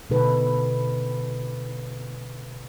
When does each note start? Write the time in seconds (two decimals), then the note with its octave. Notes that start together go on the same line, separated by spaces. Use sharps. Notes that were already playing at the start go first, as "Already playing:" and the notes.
0.10 B2 D3 D#4 A4 B4